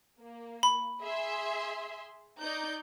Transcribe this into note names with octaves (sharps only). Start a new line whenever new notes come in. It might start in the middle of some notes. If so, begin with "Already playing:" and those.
A#3
B5
G#4 E5 C6
D#4 D5 G6